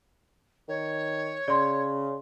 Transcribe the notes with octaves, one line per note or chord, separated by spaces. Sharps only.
D#3 C#5
C#3 D5 C6